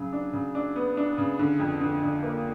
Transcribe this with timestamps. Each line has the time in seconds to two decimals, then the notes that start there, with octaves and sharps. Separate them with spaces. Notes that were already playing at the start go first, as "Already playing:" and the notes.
Already playing: C#3 F#3
0.13 D4
0.33 C#3
0.55 D4
0.76 B3
0.97 D4
1.18 C#3
1.39 D3
1.60 F2
1.81 D3
2.02 D3
2.23 A#3